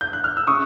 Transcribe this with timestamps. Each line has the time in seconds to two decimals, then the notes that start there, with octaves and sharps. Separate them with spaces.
0.01 G6
0.13 F#6
0.24 F6
0.37 E6
0.47 C#3 C#6 D#6